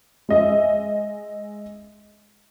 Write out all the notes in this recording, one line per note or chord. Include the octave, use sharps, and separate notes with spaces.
G#3 D#5 E5